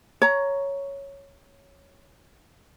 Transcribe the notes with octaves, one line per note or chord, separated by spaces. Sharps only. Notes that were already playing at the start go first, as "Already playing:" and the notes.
C#5 A#5